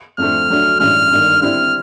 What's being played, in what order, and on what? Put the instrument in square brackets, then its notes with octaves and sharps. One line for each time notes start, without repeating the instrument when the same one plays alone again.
[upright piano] F2 D3 F3 A3 C4 [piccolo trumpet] F6
[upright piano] D2 D3 F#3 A3
[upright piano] A1 G2 E3 G#3 C#4 [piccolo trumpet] F6
[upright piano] G1 G2 D#3
[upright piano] D3 G3 C4 E4 [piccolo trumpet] F6